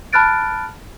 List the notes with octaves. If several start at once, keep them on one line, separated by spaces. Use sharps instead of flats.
A5 B5 F6 F#6 A6 D7